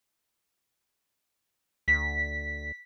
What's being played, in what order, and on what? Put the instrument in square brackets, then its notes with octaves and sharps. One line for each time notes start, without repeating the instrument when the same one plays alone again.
[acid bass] D2 [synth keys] B6